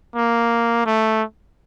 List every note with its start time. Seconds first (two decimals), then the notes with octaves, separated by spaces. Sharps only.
0.16 A#3
0.86 A3